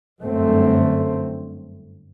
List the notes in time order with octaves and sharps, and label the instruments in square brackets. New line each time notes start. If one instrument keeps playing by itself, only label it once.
[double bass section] G1 F#2 D3 A3 C4